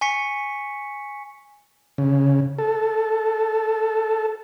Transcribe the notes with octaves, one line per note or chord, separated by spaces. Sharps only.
G#5 C#6 B6 C#7
C#3
A4